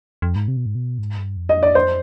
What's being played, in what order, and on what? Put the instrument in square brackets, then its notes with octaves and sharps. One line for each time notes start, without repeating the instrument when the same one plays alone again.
[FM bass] F2
G#2
C3
B2
G#2
B2
G#2
G2
F2
[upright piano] D#5
D5
C5